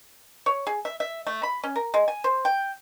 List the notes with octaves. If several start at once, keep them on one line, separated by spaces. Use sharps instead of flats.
C#5
G#4
E5
E5
A3
B5
C#4
A#4
G#3
G#5
C5
G5